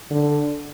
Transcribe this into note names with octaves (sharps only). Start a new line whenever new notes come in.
D3